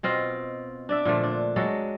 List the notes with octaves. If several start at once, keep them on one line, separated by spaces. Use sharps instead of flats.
B2 C4 F4 D#5
D4 D5 E5
A#2 D3 F3 A3
D4
F#3 G#3 F#4 A4